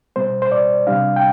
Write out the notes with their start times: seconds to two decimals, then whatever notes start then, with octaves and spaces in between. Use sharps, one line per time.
0.16 B2 G3 B3 C5
0.42 C5
0.52 D5
0.87 C3 G3 D4 F5
1.16 G5